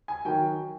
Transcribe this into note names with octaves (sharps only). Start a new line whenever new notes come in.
G#5
D#3 F#3 G5